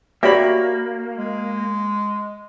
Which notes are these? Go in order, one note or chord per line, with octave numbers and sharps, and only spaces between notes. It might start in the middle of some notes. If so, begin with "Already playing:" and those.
A#3 F#4 G4 C#5 D5 E5 B5
G#3